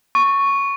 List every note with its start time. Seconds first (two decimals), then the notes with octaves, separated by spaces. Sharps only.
0.15 C#6